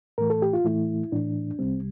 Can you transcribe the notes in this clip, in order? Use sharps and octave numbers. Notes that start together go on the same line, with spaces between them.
A2 E3 A3 A#4
A4
G4
F4
A2 E3 A3 E4
A2 E3 A3 D4
C2 C3 G3 C4